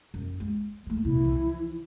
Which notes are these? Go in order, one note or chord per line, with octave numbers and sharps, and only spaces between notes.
F#2
G#3
E3 A3
C2 A#2 E4
E3 F3